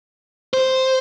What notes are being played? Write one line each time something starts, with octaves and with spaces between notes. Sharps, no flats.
C5